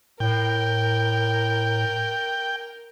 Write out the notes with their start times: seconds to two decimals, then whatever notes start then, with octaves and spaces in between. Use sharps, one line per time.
0.20 A2 A#4 G5